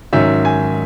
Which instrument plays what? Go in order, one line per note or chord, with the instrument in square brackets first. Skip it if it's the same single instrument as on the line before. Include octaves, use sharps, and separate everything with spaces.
[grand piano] G#2 D#3 F#3 C#4 E5
G#5